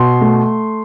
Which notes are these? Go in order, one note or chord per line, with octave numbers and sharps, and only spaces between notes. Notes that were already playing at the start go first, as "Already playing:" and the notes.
Already playing: B2 C6
A3